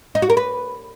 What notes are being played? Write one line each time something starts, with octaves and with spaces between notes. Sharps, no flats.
D#4
F#4
A#4
B4